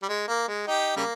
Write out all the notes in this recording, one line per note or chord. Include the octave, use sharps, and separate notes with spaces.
G3
G#3
A#3
G#3
D#4 G4
C#3 G3 A#3